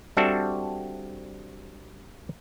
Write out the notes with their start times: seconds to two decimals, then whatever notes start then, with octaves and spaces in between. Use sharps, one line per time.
0.17 G3 C4 D4 F#4 A4 E5